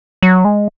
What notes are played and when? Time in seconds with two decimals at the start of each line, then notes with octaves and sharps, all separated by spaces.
0.22 F#3
0.45 G#3